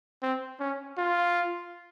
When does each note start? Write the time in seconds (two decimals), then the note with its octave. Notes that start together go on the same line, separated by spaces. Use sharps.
0.23 C4
0.60 C#4
0.98 F4